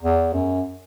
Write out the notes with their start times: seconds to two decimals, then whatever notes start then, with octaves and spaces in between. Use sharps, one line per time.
0.02 E2
0.33 F#2